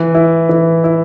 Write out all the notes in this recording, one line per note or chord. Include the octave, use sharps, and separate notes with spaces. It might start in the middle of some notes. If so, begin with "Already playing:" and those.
Already playing: E3
E4
E3
E4